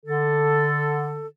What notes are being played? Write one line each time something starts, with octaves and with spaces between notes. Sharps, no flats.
D3 A4